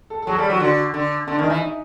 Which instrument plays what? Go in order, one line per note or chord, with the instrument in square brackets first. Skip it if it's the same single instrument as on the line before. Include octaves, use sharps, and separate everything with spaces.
[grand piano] A4
A4
[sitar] F#3 [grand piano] G#4
[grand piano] A4
[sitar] G3
[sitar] F#3 [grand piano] F#4
[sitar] D3 [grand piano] F#4
[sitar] D3
[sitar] D3 [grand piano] D4
[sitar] D#3 [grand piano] D4
[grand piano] D#4
[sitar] E3
[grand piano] D#4